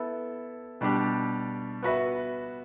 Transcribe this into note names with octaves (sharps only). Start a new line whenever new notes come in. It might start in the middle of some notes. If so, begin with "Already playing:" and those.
Already playing: B3 E4 A4 E5
B2 G3 D4 G4
B3 F#4 B4 E5